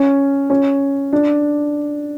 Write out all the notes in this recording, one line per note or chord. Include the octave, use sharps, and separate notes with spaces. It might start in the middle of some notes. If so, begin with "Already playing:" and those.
Already playing: C#4
C#4
D4